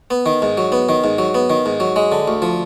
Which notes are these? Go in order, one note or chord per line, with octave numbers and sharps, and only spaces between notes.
B3
D#3
G#2
F#3
B3
D#3
G#2
F#3
B3
D#3
G#2
F#3
G#3
D3
D2
F3